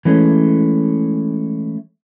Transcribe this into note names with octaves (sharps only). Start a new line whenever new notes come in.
E3 G#3 A3 C#4